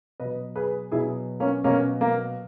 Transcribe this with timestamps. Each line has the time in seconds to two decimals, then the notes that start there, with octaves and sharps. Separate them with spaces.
0.20 B2 F#3 B4 D#5
0.56 G#4 B4
0.92 B2 F#3 E4 G#4
1.40 A#3 C#4
1.64 B2 F#3 A#3 C#4
2.01 A#3